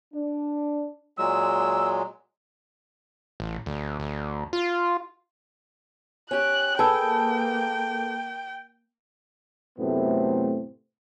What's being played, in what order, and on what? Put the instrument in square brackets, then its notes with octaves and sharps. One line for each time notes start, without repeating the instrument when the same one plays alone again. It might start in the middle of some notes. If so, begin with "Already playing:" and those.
[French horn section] D4
[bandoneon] A#2 F#3 G#3 [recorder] E6
[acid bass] A1
D2
D2
F4
[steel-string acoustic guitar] C#4 G4 [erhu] F#6
[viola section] A#3 [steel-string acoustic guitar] G#4 A4 B4 [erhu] G5 [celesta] A5 E6
[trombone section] F#2 A2 C3 A3 B3 C4